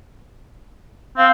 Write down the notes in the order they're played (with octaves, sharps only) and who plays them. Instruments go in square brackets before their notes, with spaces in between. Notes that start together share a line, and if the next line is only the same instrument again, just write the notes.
[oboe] C4 [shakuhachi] F5